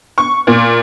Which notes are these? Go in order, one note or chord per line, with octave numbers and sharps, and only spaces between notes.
C#6
A#2